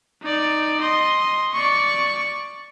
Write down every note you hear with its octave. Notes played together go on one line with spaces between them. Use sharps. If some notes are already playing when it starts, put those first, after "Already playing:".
D#4 D5
D#5 C6
D5 C#6